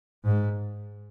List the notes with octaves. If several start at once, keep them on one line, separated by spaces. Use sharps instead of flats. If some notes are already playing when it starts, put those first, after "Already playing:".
G#2